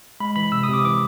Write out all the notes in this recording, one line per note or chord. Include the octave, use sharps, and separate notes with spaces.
G#3 B5
E3 B5
C3 E6
C3 D#6
D6
E3 D6